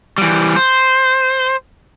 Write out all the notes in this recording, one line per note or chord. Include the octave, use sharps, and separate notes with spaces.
E3 G3
C5